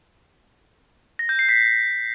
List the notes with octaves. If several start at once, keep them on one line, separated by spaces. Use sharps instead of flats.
A#6
G6
C7
B6